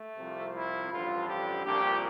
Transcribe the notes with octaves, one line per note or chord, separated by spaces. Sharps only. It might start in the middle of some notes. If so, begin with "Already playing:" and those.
Already playing: A3
C2 C3 F3
E4
A1 G2 D3 F3 F4
G4
C2 A#2 F3 G4